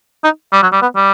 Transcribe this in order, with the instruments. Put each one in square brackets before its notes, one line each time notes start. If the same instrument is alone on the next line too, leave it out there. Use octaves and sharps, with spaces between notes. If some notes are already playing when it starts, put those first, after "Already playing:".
[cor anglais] D#4
G3
F#3
G3
B3
G3